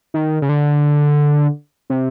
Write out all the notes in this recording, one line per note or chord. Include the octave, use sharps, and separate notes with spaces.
D#3
C#3
D3
C3